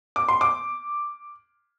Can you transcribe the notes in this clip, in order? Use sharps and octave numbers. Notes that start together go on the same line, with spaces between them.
D6
C6
D6